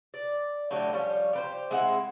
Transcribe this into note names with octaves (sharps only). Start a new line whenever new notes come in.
D5
A2 D3 F#3 G4
F3 G3 C#4
G4 B4 C5
G#3 C4 E4 F#5